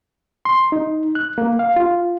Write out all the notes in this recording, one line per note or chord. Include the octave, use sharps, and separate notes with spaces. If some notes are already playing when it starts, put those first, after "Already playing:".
C6
D#4
F#6
A#3
F5
F4